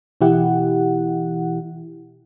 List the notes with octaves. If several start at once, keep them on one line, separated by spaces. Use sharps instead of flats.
B2 E3 E4 G4 F#5